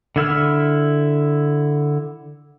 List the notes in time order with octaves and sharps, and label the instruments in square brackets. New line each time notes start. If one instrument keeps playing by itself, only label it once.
[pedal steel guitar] D3 E4 E6 F6